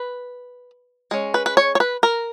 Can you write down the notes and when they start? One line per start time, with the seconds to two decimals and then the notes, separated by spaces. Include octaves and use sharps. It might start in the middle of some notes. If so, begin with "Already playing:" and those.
Already playing: B4
1.11 G#3 C#4
1.34 B4
1.46 B4
1.57 C#5
1.75 C#5
1.80 B4
2.03 A#4